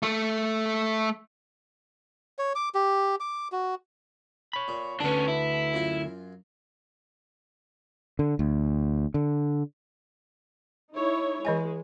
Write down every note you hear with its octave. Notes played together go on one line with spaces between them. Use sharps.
A3
C#5
D6
G4
D6
F#4
C#5 B5
A#2
D2 D3 B3 C#4 D4 A5
E4
F#2 F4
D3
D2
D3
D#4 E4 C#5
E3 G#3 D#5 G#5